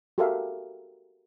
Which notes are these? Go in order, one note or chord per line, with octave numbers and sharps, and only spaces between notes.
F#4 G4 A4 A#4 E5 F5